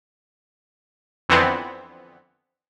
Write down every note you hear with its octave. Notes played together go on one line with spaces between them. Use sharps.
F2 D3 E3 B3 C4